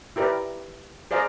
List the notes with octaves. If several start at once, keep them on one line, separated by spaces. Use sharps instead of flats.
E4 G4 A#4 B4 D5
G#4 C5 D5 F5 A#5